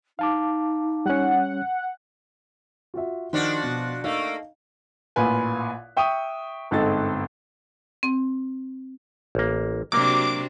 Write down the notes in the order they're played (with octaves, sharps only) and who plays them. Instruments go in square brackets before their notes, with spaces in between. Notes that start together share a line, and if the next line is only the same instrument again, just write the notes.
[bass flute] D#4 [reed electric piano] F5 A5 D6
[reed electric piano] G3 C#4 [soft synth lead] F#5
[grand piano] F4 F#4 E5
[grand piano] D#3 [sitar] F3 D4 F#4
[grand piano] B2
[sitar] A3 A#3 [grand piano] D#4 F5
[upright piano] A1 A#2 F4 B4 G#5
E5 G5 C#6 D#6 D#7
G1 G#2 C4 A4 D#5 A6
[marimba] C4
[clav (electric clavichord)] A1 A#3
[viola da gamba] C3 D4 F#4 [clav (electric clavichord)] F#3 A#3 [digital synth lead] D6